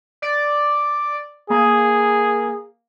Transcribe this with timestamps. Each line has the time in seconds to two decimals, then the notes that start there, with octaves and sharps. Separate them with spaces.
0.22 D5
1.50 A#3 G#4